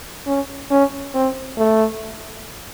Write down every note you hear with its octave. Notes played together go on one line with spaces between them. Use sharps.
C#4
C#4
C4
A3